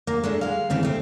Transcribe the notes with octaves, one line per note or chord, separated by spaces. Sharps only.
A#3
G#3 A3 D4
G#3 F5
D#2 C#3 E3 C4
A3 C4